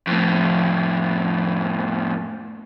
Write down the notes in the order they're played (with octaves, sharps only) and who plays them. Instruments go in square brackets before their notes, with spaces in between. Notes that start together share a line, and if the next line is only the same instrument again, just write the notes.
[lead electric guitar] F2 A2